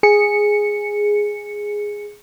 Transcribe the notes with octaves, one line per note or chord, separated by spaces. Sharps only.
G#4 C#7